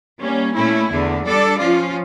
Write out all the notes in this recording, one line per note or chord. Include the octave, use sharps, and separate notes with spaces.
G3 A#3 C#4
A#2 A3 C#4 E4
E2 D3 A3
G3 D4 A4 D5
F3 C#4 F4